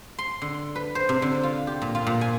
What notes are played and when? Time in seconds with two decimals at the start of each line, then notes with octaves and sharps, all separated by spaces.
0.19 C6
0.42 D3
0.75 B4
0.95 C5
1.09 C3
1.22 D3
1.43 F4
1.67 G4
1.82 A#2
1.95 F4
2.07 A#2
2.21 G#5